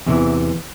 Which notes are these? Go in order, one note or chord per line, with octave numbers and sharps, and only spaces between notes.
E2 C3 E3